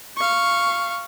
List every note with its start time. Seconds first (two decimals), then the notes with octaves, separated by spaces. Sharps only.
0.17 F5 C#6